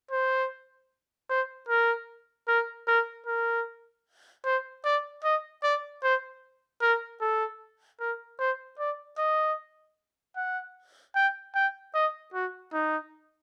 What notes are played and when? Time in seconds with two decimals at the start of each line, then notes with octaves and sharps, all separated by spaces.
0.11 C5
1.30 C5
1.69 A#4
2.48 A#4
2.87 A#4
3.27 A#4
4.45 C5
4.85 D5
5.24 D#5
5.63 D5
6.03 C5
6.82 A#4
7.21 A4
8.00 A#4
8.39 C5
8.79 D5
9.18 D#5
10.36 F#5
11.15 G5
11.55 G5
11.94 D#5
12.34 F#4
12.73 D#4